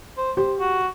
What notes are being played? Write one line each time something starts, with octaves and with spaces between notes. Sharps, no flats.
C5
G4 C5
F#4